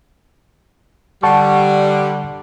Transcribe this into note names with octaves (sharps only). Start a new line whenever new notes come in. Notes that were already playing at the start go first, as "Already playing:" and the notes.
D3 G3 F#5 A5 C#6